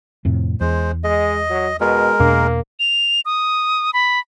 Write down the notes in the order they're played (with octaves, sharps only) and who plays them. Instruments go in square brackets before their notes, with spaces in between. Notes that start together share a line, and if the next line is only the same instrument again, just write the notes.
[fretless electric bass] F2 A2 C3
[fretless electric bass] E2 [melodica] G#3 C5
[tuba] G#3 [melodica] D#5
[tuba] F#3
[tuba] B2 [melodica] G#3 A#4
[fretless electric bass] E2 B2 D4 [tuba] A#3
[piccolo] F7
D#6
B5